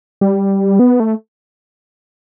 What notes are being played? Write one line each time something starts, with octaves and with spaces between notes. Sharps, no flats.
G3
B3
A3